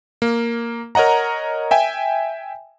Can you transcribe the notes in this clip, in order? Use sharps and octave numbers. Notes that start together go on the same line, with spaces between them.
A#3
A#4 C#5 D#5 F#5 A#5
E5 G5 G#5